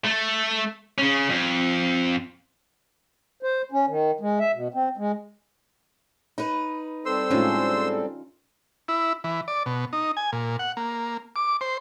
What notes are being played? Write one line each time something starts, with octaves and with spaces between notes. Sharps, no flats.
A3
C#3 C#4
F2
C5
C#4
D#3
G#3
E5
B2
C4
G#3
D#4 B4
G3 C4 A4 C5 C6 E6
A2 G#3 C#4 D#4 F4
E4
E3
D5
B2
D#4
G#5
A#2
F#5
A#3
D6
C5